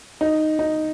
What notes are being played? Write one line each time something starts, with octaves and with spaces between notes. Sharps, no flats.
D#4
D#4